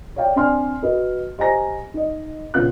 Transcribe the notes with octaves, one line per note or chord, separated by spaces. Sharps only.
C#5 D5 F5 G5
C4 D4 D5 G#5 C6 F6
F#4 B4 D#5
G4 C5 D#5 G#5 A#5 A#6
D#4 D#5
A#1 C#3 B3 F4 F#6